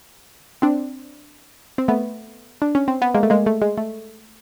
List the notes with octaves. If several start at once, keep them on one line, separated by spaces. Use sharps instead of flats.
C4 D4
C4
A3 B3
D4
C#4
C4
B3
G#3 A#3
A3
G#3 A#3
A3
G#3
A3